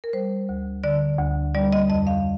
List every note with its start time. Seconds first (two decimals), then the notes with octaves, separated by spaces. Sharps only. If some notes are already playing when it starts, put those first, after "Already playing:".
0.04 A#4
0.13 G3 C5
0.49 D2
0.84 D3 D5
1.19 D2
1.55 G3 D5
1.73 D#5
1.89 F2 D#5
2.07 F5